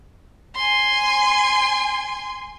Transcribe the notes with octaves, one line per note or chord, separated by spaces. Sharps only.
G#5 C6